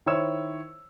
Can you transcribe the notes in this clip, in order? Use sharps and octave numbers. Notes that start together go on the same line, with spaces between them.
D#3 E4 C5 C#5 E6 E7